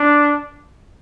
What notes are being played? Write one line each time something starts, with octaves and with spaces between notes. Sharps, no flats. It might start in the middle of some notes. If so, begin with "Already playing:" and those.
Already playing: D4